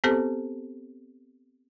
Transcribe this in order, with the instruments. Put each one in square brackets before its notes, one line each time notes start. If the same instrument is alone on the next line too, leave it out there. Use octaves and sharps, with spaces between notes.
[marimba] B3 C4 G4 A4 C5